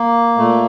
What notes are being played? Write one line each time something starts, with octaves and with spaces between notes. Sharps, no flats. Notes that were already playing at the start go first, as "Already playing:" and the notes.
Already playing: A#3
A#2 A3